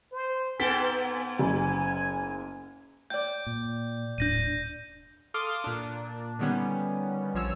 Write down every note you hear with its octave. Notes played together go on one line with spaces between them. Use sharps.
C5
G#2 B3 A4 G#5 B6
F#1
D5 G5 G6
A#2
D#1 A2 D4 G6 A#6 D#7
A4 F5 C6 D6 D#6 F6
A#2 D4
D3 D#3 G3 B3 C#4
A#1 F3 C#5 E6